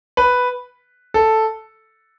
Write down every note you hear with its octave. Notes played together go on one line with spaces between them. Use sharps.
B4
A4